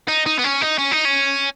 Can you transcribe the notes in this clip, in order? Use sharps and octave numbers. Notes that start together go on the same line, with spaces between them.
D#4
D#4
B3
C#4
D#4
C#4
D#4
C#4